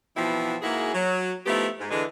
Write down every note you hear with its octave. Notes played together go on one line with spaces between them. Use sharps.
B2 E3 F3 B3 C4 E4
G#2 A#3 E4 F#4 G#4
F#3
F3 A3 B3 D#4 E4 G4
G#2
D3 E3 G#3